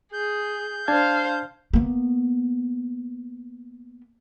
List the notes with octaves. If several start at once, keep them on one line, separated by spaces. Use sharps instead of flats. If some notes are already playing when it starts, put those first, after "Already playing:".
G#4 G6
D4 C5 F5 A5 G#6
A#3 B3